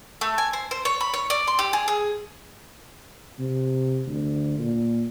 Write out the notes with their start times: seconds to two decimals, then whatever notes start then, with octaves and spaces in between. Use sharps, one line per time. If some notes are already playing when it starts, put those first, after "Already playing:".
0.21 A3
0.38 G#5
0.53 C5
0.71 C5
0.85 C#5
1.01 B5
1.14 C#5
1.30 D5
1.47 C6
1.59 G4
1.73 G#4
1.88 G#4
3.39 C3
4.07 D2
4.59 A#2